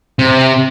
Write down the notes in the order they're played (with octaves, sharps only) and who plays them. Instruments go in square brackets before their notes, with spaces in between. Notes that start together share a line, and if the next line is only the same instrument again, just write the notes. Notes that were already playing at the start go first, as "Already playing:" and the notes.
[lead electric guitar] C3